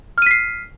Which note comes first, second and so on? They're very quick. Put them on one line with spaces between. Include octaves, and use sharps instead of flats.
F6 D#7 B6 C7